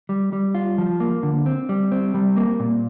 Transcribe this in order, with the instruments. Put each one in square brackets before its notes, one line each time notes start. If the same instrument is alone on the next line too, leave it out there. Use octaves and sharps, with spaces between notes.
[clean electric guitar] G3
G3
F4
F3
A#3
D3
C4
G3
C4
G3
A#3
A#2